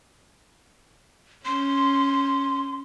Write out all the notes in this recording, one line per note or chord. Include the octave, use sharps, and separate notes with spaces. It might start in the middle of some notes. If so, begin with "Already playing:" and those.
C#4 C6